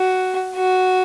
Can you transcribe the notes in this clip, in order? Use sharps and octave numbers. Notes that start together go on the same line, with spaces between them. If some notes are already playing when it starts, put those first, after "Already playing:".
Already playing: F#4
F#4